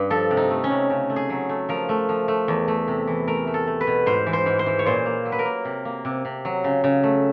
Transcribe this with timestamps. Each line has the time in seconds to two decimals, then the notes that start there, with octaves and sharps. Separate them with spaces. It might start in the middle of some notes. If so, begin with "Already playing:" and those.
Already playing: G2
0.10 F3 A4
0.31 C3
0.37 D#4
0.50 A3
0.64 C#4
0.70 C3
0.90 C#3
1.10 A3
1.16 G#4
1.30 F#3
1.49 A3
1.69 F3 A#4
1.89 A3
2.09 F3
2.28 A3
2.48 E2
2.68 A3
2.88 C3
3.07 E3
3.27 A3 A#4
3.47 A3
3.54 A4
3.67 A3
3.81 B4
3.87 B2
4.06 G#2 C5
4.26 E3
4.33 C5
4.46 G#2
4.59 C5
4.66 E3
4.79 C#5
4.86 A#2 C5
5.06 A#3
5.25 F#3
5.32 B4
5.39 A#4
5.45 A#3
5.65 C3
5.85 A#3
6.05 C3
6.25 C3
6.45 F#3
6.64 C#3
6.84 C#3
7.03 A3